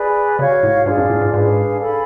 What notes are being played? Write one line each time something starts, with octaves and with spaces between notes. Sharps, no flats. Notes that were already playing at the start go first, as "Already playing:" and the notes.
Already playing: G#4 B4 D5
C#3 F#4 C#5 F5
A2
G#2 D4 F4 G#4 D5
F#2
A2
G#2
G#2 D4 G#4 B4 F5
A4 F5 G#5 B5